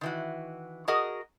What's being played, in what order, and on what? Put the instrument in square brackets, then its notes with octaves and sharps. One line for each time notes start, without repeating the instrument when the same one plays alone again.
[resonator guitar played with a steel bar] D#3 E3 F#4
F#4 G#4 A#4 D#5 F#5